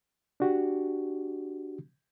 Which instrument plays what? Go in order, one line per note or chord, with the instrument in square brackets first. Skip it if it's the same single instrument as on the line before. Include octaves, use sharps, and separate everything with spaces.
[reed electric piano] D4 F#4 G4